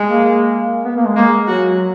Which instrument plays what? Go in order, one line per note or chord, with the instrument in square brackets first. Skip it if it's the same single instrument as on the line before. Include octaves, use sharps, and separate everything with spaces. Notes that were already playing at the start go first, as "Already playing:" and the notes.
Already playing: [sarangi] G#3
[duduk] A#3
B3
A#3
G#3
[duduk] G#3 [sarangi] A#3
[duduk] F#3 [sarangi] F#4